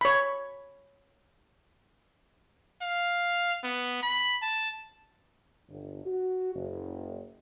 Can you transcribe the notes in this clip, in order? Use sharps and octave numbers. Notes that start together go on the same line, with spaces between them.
C#5 B5
F5
B3
B5
A5
G1
F#4
F#1